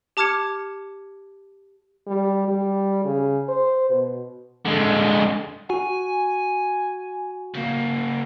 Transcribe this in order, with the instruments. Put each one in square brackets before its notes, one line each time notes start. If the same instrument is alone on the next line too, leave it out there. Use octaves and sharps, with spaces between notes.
[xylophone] G4 A5 D6 F6 G#6 C#7
[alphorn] G3
G3
C#3
C5
B2
[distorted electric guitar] D3 G#3
[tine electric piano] F#4 [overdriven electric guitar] G#5
[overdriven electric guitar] C#3 A#3